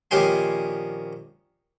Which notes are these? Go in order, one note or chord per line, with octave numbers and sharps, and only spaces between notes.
A#1 D#3 C#4 G4 G#5 C6